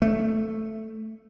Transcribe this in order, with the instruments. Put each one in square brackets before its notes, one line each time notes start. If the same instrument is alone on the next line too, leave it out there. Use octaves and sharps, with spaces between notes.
[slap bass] A3